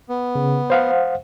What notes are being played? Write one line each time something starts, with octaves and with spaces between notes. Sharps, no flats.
B3
C#3
C5 F5 F#5